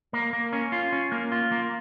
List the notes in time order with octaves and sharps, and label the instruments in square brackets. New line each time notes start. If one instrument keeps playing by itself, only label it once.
[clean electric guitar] A#3
A#3
C#4
F4
C#4
A#3
F4
A#3